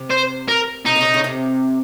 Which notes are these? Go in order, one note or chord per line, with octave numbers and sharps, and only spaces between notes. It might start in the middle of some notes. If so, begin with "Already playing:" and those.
Already playing: C3
C5
A#4
C3 D#4
A#2
C#3
C3
C#3
C3